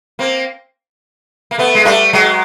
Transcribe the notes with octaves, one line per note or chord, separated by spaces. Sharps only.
A#3 C4
A#3
A3 B3
G#3
G3 A3
F#3 G#3